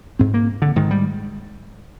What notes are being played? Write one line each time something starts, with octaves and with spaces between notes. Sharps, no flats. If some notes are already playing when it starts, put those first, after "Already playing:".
G#2 C4
A#3
D3
G#2 D#3
G3